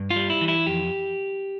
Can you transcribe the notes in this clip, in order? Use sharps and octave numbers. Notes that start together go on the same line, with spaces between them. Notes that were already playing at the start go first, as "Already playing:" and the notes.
Already playing: G2
F4
G3
E4
E3
E4
F2 G4